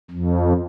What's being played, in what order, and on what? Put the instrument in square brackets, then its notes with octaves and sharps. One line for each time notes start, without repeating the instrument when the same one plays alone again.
[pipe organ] F2